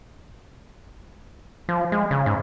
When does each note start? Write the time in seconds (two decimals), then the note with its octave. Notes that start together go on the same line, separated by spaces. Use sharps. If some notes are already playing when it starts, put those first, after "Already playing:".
1.69 F3
1.92 G#3
2.11 C#3
2.26 G#2